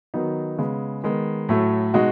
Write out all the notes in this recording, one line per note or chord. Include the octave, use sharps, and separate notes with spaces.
D#3 F#3 B3 D#4
C#3 G#3 B3
D#3 G#3 B3
A2 F#3 A3
B2 G#3 D#4 F#4